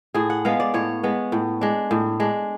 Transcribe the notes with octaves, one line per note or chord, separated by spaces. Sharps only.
A2 G#4
F#5
G#3 B3 F5
D5
A2 C#5
G#3 B3
A2
G#3 D4
A2
G#3 D4